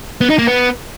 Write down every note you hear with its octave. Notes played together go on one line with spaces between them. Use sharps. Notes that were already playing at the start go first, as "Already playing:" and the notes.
B3
D#4
A#3
B3